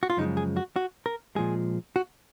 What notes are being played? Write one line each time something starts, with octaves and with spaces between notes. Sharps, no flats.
F#4
F4
F#2 C#3 F3 G#3 D#4
G#4
F#4
F#4
A#4
A#2 F3 G#3 G#4
F#4